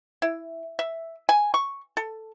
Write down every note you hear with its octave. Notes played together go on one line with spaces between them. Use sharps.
E4
E5
G#5
C#6
A4